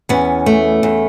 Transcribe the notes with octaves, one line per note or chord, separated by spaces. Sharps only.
E2 B3 C#4
A3
E2